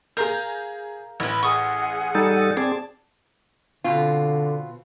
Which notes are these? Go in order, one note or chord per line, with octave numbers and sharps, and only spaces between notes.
G#4 A#4 F5 A#5 G6
A1 E4 B4
G#4 F#5 C#6 D#6
G3 D#4 A4
C4 G#4 D5 A5
B2 D3 C4 F4